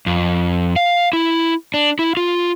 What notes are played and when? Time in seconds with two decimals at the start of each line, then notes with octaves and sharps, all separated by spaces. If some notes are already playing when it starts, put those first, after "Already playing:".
0.06 F2
0.76 F5
1.13 E4
1.74 D4
1.99 E4
2.17 F4